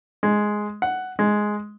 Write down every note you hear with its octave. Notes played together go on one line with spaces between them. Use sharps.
G#3
F#5
G#3